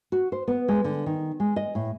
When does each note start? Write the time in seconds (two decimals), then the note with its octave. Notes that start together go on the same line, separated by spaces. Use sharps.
0.12 F#4
0.32 C5
0.48 B3
0.68 G#3
0.84 D3
1.06 D#3
1.40 G#3
1.56 D#5
1.75 A2